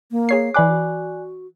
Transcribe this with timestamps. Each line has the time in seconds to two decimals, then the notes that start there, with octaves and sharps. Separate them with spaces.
0.11 A#3
0.29 G#4 C#5 C7
0.54 E3 D5 G#5 B5 D6 F#6
0.68 F#4